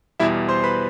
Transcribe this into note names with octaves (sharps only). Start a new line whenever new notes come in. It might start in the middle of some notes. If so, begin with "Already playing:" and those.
E2 B2 G3 E4 E5
C5 C6
B4 B5